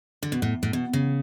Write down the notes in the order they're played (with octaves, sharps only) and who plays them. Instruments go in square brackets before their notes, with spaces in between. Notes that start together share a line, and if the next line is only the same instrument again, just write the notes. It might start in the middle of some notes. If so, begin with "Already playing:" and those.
[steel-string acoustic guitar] D3
B2
A2
A2
B2
C#3